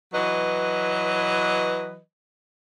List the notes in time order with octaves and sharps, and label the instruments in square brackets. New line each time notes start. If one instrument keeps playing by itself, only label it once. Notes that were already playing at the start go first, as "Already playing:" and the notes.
[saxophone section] E3 F#3 B4 D#5